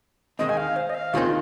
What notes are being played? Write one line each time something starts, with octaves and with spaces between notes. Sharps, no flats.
D#2 D#3 G#3 C4 D#4 D#5
G#5
F5
C5
D#5
F5
D#2 D#3 G#3 C4 D#4 F4